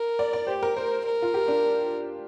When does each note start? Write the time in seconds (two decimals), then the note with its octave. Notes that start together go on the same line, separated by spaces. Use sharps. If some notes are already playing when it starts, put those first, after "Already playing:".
Already playing: A#4
0.19 D5
0.33 D5
0.47 G4 C5
0.63 A#4
0.76 A#4 C5
1.05 A#4
1.22 F4
1.34 G4
1.48 D4